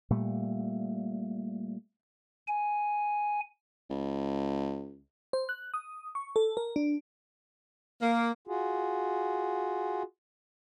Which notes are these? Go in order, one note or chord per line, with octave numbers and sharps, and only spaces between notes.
A#2 G3 A3
G#5
C#2
C5
F#6
D#6
C#6
A4
A#4
D4
A#3
F4 F#4 G#4